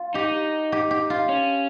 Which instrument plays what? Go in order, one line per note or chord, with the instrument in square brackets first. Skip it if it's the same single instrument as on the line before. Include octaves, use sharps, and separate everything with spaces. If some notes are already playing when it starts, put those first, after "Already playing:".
Already playing: [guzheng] F4
[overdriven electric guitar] D#4 [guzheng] G4
[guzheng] G4
G4
F4
[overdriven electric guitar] C#4